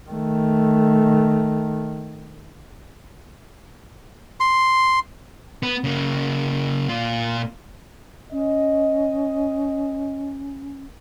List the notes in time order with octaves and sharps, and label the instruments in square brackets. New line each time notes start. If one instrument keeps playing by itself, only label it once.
[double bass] D#3 A3
[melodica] C6
[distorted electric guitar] B3
C#3 A#3
A#2 F4
[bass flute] C#4 [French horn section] D#5